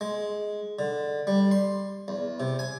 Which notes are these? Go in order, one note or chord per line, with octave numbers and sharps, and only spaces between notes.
G#3
D3
G3
C6
E2
C3
G#5